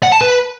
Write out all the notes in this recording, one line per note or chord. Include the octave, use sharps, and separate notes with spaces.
F#5
A5
B4